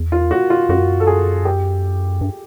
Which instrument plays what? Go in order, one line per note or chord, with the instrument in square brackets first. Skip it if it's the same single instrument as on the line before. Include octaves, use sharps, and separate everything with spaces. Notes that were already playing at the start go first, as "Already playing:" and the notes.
Already playing: [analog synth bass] E2
[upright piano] F4
F#4
F4
[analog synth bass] F#2 [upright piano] F#4
[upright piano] A4
G#4
G4
[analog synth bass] G2